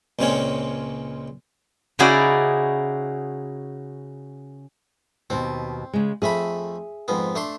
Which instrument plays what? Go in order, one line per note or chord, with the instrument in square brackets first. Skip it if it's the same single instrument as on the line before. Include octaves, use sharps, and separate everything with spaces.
[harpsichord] C#2 A#2 G#3 C4 C#4 C#5
[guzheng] C#3 D#4 E4 F#4 G#4 D5
[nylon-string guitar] D#2 B2 [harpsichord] C4
[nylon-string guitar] C#3 G#3
[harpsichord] F2 A3 B5 [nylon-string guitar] G#4 E5
[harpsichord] F2 G#2 B3
A3 D4 C6